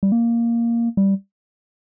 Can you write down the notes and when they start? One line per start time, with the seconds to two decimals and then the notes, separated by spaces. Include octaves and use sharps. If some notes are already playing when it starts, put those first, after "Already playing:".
0.03 G3
0.12 A#3
0.97 G3